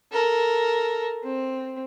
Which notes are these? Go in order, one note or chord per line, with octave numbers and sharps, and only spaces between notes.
A4 A#4
C4